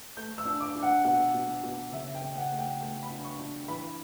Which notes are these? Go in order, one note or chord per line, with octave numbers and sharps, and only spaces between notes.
A3 G6
E6
D4
D6
D4
F#5
B2 F#5
B2
B2
C#3 E5
G5
C#3
F#5
A3
G5
A3 G5
B5
D4
C#6
D4
E3 B5